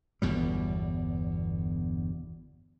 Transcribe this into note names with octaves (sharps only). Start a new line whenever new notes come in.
G1 E2 B2 G3